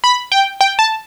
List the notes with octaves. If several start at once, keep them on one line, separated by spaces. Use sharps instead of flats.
B5
G5
G5
A5